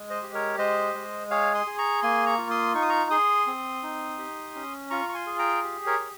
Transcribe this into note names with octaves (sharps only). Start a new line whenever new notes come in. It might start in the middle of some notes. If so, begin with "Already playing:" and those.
Already playing: G#3
C5 D#5
G4
A#4 C#5
G#3 C5 D#5
G#3
G#4 C#5 F5
C6 D#6
G#4
A#5 C#6
A#3 G#5 C6
A#5 C#6
F4
C6 D#6
D#4 C#6
D#6
A#5 C#6
G#4 C6 D#6
C4
D#4
G4
C#4
F4 A#5 C#6
C#6
G#5 C6
G#4
G5 A#5
G4
A#4 C#5
G4